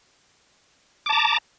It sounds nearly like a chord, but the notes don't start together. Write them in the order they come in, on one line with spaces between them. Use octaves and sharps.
D6 A5 A#5